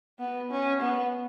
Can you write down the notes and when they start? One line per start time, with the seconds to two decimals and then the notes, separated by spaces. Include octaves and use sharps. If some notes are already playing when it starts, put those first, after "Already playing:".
0.19 B3
0.51 C#4
0.81 B3